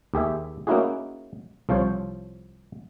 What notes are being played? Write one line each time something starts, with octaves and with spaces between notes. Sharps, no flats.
D#2 G4 G#4 E5
A#3 C#4 D#4 E4 F#4 G#4
C2 F3 F4 C5 C#5